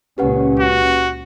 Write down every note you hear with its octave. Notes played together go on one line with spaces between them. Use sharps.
C#2 A#2 C#4 G4 B4 F#5
F#4